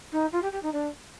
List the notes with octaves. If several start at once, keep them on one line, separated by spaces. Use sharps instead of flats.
D#4
F4
G4
G4
D#4
D4